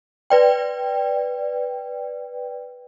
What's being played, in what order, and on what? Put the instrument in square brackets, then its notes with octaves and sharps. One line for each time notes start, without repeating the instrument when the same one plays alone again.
[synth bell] B4 D5 G5